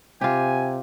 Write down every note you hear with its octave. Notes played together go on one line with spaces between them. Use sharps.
C3 F4 G4 G#5